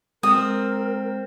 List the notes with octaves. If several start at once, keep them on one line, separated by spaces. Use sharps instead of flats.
G#3 C4 A#4 D#6